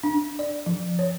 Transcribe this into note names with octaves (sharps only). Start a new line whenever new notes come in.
D4
D5
F3
C#5